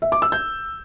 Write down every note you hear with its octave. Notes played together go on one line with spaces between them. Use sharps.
E5
D6
E6
G6